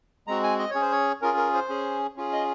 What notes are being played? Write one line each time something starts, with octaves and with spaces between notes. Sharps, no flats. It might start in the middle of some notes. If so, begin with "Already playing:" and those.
G#3 C4 F#4 A#5
G#5
D#5
C#4 G#4 C#5
C5
C#5
C#4 F4 G#4 A#4
A#4
C5
C#4 G#4
C#4 F4 G#4
D#5